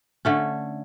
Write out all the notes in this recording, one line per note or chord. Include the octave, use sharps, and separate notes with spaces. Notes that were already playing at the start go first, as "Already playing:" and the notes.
D3 A3 C#4